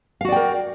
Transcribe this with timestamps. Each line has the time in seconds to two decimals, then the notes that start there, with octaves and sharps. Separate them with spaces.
0.21 F5
0.25 F#4
0.28 D5
0.32 G5
0.36 A#4